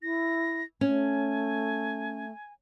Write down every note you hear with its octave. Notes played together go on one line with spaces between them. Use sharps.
E4 A#6
A3 C#4 G#5